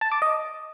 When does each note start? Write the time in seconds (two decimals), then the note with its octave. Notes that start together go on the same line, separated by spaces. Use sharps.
0.01 A5
0.12 D6
0.22 D#5